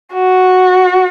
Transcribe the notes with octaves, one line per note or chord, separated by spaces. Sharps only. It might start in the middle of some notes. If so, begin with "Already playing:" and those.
F#4